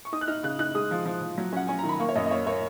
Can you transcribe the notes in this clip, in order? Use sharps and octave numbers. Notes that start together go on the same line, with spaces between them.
C#6
D#4 D#6
F#6
D#4 F6
C#3 F#6
D#4 F#6
G#3 D#6
F3
F3
F3
F#3
C#4 F#5
C#4 G#5
D#3 A#5
B5
A#3 C#6
C#5
F#2 D#5
D#5
A#3 C#5
A#3 C#5